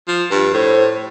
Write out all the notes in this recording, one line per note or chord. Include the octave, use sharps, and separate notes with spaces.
F3
G2
A2 C5